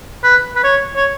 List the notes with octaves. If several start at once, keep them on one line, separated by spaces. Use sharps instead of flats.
B4
B4
C#5
C#5